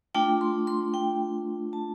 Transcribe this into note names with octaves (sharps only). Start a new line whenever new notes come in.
A3 D4 F4 G5
C6
C6
G5
A5